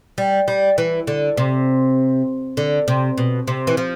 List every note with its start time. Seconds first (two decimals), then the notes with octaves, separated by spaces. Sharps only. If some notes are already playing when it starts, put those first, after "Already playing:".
0.18 G3
0.48 G3
0.78 E3
1.07 D3
1.37 C3
2.57 D3
2.88 C3
3.18 B2
3.47 C3
3.67 E3
3.77 F3